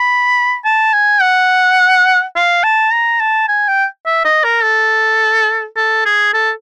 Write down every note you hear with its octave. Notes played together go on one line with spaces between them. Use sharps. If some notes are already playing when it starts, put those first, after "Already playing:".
Already playing: B5
A5
G#5
F#5
F5
A5
A#5
A5
G#5
G5
E5
D#5
A#4
A4
A4
G#4
A4